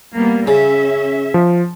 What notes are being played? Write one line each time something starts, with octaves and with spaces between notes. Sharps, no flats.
G3 A#3 B3
C#3 C#4 E5
F3